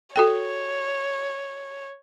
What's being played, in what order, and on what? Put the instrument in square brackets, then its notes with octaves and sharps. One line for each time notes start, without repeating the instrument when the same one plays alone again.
[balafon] F#4 A4 G5 [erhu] C#5